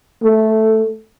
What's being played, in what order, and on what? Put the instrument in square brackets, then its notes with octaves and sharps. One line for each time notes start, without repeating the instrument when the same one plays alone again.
[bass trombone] A3